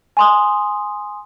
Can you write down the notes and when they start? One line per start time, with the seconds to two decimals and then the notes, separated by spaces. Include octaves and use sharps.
0.17 G#5 C6 D#6